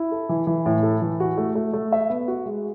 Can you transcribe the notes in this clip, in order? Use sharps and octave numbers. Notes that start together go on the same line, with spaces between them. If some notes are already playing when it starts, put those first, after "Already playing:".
Already playing: E4
A4
E3
E3
A2
A4
E3
F#4
A3
A3
A3
E5
B3
F#4
G#3